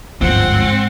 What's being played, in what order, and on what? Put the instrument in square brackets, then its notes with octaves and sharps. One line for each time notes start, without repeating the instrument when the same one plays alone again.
[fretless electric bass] D1 G1 F3 [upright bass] G#2 G#3 [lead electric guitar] C4 [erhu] F#5